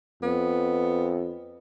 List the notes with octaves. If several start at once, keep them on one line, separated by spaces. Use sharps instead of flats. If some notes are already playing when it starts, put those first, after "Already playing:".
F2 B3